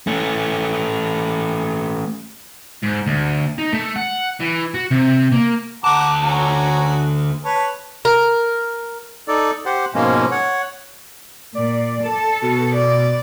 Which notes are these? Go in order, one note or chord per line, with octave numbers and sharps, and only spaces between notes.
A3 C#4
G#2
D2
D#4
A3
F#5
E3
F#4
C3
A#3
D2 F#5 A5 A#5 D6
C#4 F#4 A#5
B4 C#5 A5
A#4
D#4 A4 D5
G4 C5 F#5
G#2 B2 F3 G#3 A#3 C#4
C#5 F#5
A#2 D5
A4 A5
B2
D5